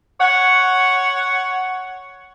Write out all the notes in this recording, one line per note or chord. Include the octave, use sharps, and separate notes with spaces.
C#5 F#5